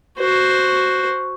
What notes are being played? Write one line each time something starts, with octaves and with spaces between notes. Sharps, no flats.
F#4 C5